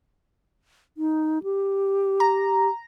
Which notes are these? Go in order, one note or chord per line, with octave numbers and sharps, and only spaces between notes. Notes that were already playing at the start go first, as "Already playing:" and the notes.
D#4
G4
A#5